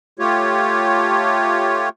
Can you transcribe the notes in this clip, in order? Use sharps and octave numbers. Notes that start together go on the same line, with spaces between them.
A3 F4 G4 C#5